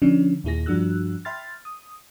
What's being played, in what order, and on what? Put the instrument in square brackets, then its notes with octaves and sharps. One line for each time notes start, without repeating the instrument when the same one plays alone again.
[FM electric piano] D3 F3 C#4 D4
D#2 A#2 E4 G#4 A#6
G2 F3 D4 F#4 E6 F#6
E5 G5 B5 C6 F6 A6
D#6